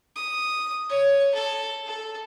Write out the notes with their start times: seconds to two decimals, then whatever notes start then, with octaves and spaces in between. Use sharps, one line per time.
0.16 D#6
0.89 C#5
1.34 A4
1.86 A4